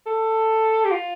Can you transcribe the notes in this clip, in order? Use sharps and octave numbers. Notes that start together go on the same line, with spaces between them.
A4
G4
F4